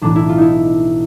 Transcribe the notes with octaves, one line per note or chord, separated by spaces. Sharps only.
B1 A2 E3 D4
E4
F4
D#4 E4